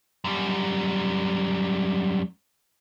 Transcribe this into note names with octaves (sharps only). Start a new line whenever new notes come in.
F#2 G3